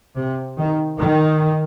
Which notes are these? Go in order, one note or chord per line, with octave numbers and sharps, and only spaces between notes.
C3
D#3
D#3